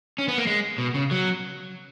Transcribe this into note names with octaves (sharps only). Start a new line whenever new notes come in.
C#4
B3
A#3
G#3
B2
C#3
F#3